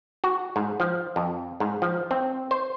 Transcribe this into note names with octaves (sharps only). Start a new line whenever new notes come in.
F#4
G#2
F3
F2
G#2
F3
C4
C5